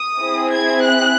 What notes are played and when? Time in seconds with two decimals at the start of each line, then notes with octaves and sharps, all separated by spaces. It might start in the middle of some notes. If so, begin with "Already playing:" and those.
Already playing: D#6
0.19 C4 E4 G#4
0.50 G#6
0.83 F#6